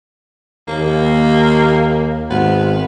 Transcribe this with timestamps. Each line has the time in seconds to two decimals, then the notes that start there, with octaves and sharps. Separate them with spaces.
0.68 D#2 A#3
2.30 G#1 B3